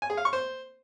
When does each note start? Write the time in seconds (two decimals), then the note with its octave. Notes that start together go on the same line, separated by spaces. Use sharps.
0.02 G#5
0.10 G#4
0.17 F5
0.25 C#6
0.33 C5